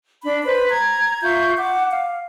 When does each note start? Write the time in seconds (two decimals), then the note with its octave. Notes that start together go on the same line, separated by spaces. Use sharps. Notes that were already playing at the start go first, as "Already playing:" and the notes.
0.23 D4 B5
0.44 B4 C5 B5
0.69 A#5 G#6
1.22 F4 E5 C#6 G6
1.57 F#5 D6
1.90 F5